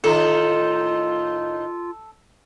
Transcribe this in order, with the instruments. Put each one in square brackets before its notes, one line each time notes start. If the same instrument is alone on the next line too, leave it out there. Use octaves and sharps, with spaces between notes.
[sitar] A2 D#3 D#4 [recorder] F4 [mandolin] A4